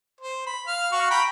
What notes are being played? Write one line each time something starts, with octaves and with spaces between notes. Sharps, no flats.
C5
B5
F5 F6
F#4 F5 C#6
G5 A#5 B5